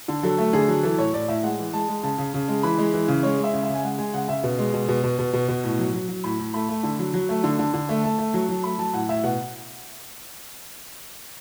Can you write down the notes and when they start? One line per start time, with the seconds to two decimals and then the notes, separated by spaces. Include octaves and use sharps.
0.08 D3
0.23 F#3 A4
0.38 A3
0.53 D3 G#4
0.68 F#3
0.83 E3 A4
0.98 A2 C#5
1.13 A2 D5
1.28 A2 E5
1.43 G#3 F#5
1.59 E3
1.73 G#3 A5
1.88 G#3
2.03 C#3 A5
2.18 C#3
2.34 C#3
2.48 G#3
2.63 E3 B5
2.78 G#3
2.93 E3
3.08 C#3
3.23 G#3 C#5
3.38 G#3
3.44 E5
3.54 C#3
3.63 E5
3.69 C#3
3.74 G#5
3.83 G#3 F#5
3.98 G#3 G#5
4.14 C#3 F#5
4.28 C#3 E5
4.43 B2
4.59 G#3
4.74 B2
4.88 B2
5.04 B2
5.19 B2
5.33 B2
5.48 B2
5.64 A2
5.79 F#3
5.94 F#3
6.09 F#3
6.24 A2 B5
6.39 A2
6.54 A3 B5
6.69 A3
6.83 D3
6.99 F#3
7.14 F#3
7.29 A3
7.44 D3
7.59 D3
7.74 D3
7.89 A3
8.04 A3 A5
8.19 A3
8.34 F#3
8.49 F#3
8.64 A3 B5
8.79 F#3 A5
8.93 A2 F#5
9.09 A2 E5
9.23 B2 F#5